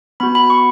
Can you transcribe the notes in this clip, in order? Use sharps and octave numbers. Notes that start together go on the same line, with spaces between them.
B3 F#4 B5
B5
C#6